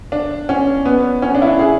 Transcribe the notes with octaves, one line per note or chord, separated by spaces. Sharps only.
D4
C#4
B3
C#4
D4
E4
D4
G#4